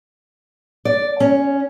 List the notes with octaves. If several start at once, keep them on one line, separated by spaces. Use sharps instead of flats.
D5
C#4